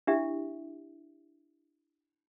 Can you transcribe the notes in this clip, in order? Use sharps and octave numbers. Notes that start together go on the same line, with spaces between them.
D4 E4 G4 E5